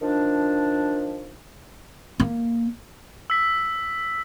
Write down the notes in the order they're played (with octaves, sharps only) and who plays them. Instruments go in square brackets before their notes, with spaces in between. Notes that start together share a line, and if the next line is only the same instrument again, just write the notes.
[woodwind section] D#3 F3 D4
[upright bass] A#3
[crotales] E6 B6